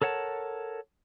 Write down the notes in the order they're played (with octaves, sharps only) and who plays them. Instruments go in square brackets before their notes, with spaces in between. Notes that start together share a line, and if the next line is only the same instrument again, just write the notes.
[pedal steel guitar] A4 A#4 C#5 F#5 A5